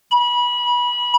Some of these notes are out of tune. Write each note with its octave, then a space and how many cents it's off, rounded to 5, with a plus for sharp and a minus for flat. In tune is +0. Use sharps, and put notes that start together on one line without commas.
B5 -25